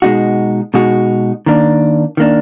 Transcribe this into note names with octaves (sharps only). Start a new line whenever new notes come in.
B2 G#3 D#4 F#4
B2 G#3 D#4 F#4
D#3 A#3 D4
D#3 A#3 D4